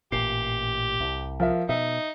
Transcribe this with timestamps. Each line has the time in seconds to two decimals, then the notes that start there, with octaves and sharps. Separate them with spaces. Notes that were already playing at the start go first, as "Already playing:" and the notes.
0.12 A1 A#2 G4 C7
1.00 C2
1.40 F3 A#4 E5
1.69 B2 D#4 E5